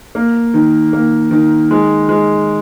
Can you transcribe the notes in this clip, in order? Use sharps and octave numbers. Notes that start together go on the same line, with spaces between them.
A#3
D#3
A#3
D#3
G#3
G#3